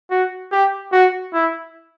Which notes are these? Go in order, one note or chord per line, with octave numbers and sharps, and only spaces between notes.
F#4
G4
F#4
E4